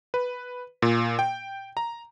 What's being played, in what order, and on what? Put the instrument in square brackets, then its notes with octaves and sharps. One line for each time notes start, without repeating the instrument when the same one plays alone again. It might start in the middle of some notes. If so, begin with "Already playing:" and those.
[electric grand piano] B4
A#2
G5
A#5